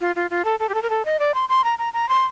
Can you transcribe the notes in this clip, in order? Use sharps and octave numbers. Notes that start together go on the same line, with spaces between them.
F4
F4
F4
A4
A4
G4
A4
A#4
A4
D#5
D5
C6
C6
A#5
A#5
A#5
C6